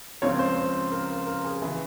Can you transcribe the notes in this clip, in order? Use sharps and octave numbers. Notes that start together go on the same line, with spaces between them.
C#2 C#3 F3 C4 C#5
C5
C5
A#4
A#4
G#4
C#3 E3 G#4